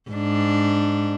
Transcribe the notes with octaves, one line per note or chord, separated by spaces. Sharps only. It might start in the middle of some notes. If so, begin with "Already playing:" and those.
G#2 D4